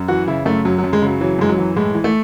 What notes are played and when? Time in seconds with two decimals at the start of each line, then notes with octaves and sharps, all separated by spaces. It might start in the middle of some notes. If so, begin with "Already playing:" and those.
Already playing: F#2
0.08 E3 F#4
0.28 C#3 E4
0.46 F#2 A3
0.65 F#2 F#3
0.78 F#3
0.84 F#2
0.93 G#3
1.02 C#3
1.07 F#3
1.21 E3 F#3
1.39 F#2 G#3
1.49 F#3
1.58 E3
1.76 A2 G#3
1.95 E3
2.04 A3